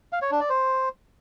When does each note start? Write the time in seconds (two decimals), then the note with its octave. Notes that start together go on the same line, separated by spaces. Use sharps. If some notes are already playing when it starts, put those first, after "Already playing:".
0.13 F5
0.22 C#5
0.31 D4
0.40 D5
0.49 C5